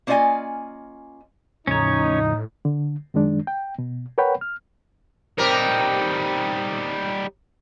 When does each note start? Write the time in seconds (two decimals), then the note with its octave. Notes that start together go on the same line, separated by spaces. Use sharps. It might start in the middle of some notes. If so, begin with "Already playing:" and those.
0.07 A#3 C#4 F4 D5 D#5 G#5
1.67 E2 A2 C#3 F3 C#4 D#4 C#5
2.65 D3
3.14 F#2 D#3 G#3 D4
3.47 G5
3.78 B2
4.18 A#4 B4 C#5 F#5 G5 B5
4.41 F6
5.38 G3 C4 D#4 G4 A#4